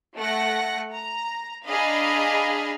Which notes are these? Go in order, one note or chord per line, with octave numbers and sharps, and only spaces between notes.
A3 F#5 A#6
A#5
D4 G#4 D#5 F5 A#5 B5